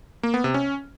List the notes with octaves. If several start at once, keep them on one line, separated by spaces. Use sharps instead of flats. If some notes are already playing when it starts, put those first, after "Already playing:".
A#3
B3
C3
C#4